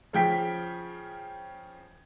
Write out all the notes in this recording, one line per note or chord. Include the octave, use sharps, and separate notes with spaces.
C#3 F3 G5 B6